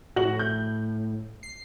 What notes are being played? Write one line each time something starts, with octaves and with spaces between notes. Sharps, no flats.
A2 F#4 F#7
G6
C7